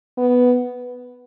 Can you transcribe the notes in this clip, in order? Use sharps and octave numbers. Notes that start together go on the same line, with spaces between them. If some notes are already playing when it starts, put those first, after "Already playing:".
B3